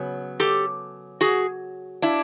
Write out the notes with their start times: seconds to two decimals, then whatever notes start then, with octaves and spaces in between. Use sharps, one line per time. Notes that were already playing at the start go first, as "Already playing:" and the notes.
Already playing: C#3 F#3 B3
0.40 G4 A4
1.21 F#4 G#4
2.02 D4 E4